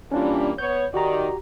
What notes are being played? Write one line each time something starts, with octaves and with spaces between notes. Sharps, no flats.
E3 G3 A#3 C#4 D4 F4
B3 C#5 G6
D#3 D#4 F#4 G4 D5 A#5